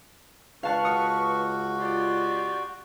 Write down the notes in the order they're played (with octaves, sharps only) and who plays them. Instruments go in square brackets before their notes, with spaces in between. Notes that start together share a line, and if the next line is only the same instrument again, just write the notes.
[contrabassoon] C#2 [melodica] D4 [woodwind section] B4 C#6 [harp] F5 A5 F#6
[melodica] F#4 [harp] D#6 F6 C#7
[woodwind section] F4 G4 D5